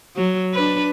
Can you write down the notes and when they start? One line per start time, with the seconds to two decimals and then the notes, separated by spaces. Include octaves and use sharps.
0.16 F#3
0.54 D4 B4